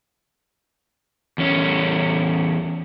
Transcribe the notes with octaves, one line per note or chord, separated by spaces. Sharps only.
E2 C#4